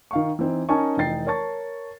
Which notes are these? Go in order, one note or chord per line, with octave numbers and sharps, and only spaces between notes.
D#3 F5 C#6
E3 C4 D#4
C#4 D#4 A#4 G#5 A5 C#6
F1 E3 D#4 G5 A6 C7
A#4 C#5 A5 C#6 A6